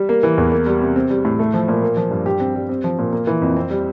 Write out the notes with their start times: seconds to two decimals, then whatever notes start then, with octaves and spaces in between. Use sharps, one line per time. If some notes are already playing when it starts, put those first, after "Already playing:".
Already playing: G3
0.09 A#3
0.23 E3
0.38 E2
0.52 A#3
0.67 G3
0.81 C3
0.96 C4
1.10 G3
1.25 A2
1.39 A3
1.54 F3
1.68 A#2
1.82 A#3
1.97 F3
2.11 G2
2.26 G4
2.40 C4
2.55 G3
2.69 C4
2.84 F3
2.99 A#2
3.13 A#3
3.27 E3
3.42 F2
3.57 C4
3.70 G3